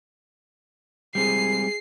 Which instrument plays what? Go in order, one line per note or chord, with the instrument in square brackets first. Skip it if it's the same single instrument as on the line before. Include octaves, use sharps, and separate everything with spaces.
[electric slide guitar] G3 G#3 C4 [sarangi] G#4 [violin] C7